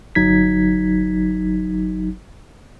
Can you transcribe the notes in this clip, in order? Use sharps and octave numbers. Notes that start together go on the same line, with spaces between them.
G1 F#3 D#4 G#6 B6